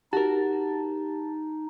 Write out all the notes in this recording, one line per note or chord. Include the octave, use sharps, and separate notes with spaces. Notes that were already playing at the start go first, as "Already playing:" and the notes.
D#4 F#4 G4 A#4 A5